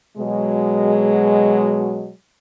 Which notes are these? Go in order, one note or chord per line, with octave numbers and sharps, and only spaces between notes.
B2 F#3 G#3